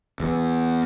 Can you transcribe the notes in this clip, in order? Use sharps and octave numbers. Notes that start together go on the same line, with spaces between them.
E2